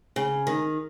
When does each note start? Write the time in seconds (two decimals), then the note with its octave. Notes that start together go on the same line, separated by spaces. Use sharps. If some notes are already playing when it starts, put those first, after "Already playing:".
0.16 C#3
0.47 D#3